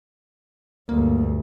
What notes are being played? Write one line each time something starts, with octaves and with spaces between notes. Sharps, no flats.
D2 G2 A#3